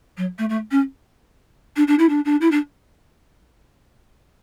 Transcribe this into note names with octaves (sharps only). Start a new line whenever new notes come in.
F#3
A3
A3
C#4
D4
D4
E4
D4
D4
E4
D4